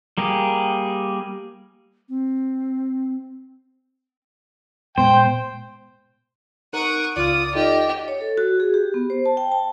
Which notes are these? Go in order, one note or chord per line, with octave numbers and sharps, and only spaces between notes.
G3 A#3 G4 G#4
C4
A#2 G#3 B3 C5 G5
D#4 A#4 F#5 C#6 D#6 D7
C#2 C#3 F4 D5 D#6 F6
D#4 F4 G4 A4 D#5
C#5
A4
F#4
G#4
G4
B3
C5
A5
G5
A5